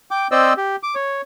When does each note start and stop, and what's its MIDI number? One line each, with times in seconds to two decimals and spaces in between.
0.11 0.27 79
0.11 0.27 86
0.31 0.53 60
0.31 0.53 72
0.31 0.53 74
0.31 0.53 75
0.31 0.53 88
0.57 0.76 67
0.83 0.95 86
0.95 1.22 73